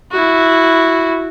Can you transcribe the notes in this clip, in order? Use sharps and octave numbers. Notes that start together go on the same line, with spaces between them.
E4 F#4